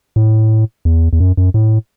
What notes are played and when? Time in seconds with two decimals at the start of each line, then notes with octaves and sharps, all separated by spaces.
0.16 A2
0.85 E2
1.13 E2
1.20 F#2
1.37 F#2
1.54 A2